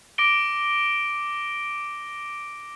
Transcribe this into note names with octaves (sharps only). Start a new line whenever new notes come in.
D6 A#6 D7 G7